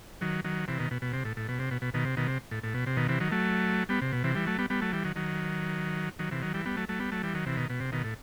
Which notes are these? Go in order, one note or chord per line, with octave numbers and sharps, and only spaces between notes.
D#3 F#3
D#3 F#3
C3 E3
B2 D#3
B2
B2
C3
A2
A2
B2
C3
B2
B2
B2 D#3
C3
B2 D#3
C3
A2
A2
B2
C3
B2 D#3
C3 E3
D#3 F#3
F#3 A3
G3 B3
C3
B2
C3 E3
E3 G3
F#3 A3
G3 B3
G3 B3
F#3 A3
E3 G3
D#3 F#3
D#3 F#3
D#3 F#3
C3 E3
D#3 F#3
E3 G3
G3 B3
F#3 A3
F#3 A3
G3 B3
F#3 A3
E3 G3
D#3 F#3
C3 E3
B2 D#3
B2
C3
B2 D#3
A2